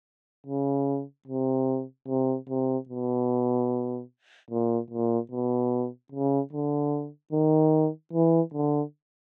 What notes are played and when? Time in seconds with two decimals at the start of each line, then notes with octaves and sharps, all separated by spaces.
0.47 C#3
1.27 C3
2.08 C3
2.49 C3
2.89 B2
4.51 A#2
4.91 A#2
5.31 B2
6.12 C#3
6.53 D3
7.33 D#3
8.13 E3
8.54 D3